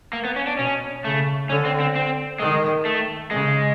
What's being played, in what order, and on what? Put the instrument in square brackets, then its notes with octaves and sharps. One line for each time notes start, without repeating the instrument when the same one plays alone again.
[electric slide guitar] A#3
B3
C#4
D4
[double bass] B2 [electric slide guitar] C#4
[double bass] C#3 [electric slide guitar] A3
[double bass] D3 [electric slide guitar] C#4
[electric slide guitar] C4
C4
C4
[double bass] D#3 [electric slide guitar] G#3
[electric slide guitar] A3
[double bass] C#3 [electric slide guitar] G#3